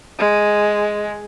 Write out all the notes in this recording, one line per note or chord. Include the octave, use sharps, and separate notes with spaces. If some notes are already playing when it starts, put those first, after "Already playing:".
G#3